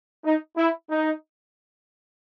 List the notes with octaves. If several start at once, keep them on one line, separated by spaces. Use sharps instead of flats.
D#4
E4
D#4